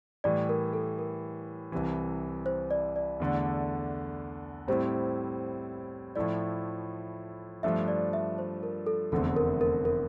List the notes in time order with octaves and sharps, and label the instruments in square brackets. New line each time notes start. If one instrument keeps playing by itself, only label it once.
[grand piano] A2 E3 G3 [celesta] D5
[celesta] A#4
A4
A#4
[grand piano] C2 C3 E3
[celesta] C5
D5
D5
[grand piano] E2 D3 A3 D4
[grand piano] A2 G3 C4 E4 [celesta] C5
[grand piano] A2 F3 A3 E4 [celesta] D5
[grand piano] G2 F3 A3 D4 [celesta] E5
[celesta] D5
E5
C5
A#4
A4
[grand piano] F1 E2 D3 A3 C4 [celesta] A4
[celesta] A#4
A#4
A#4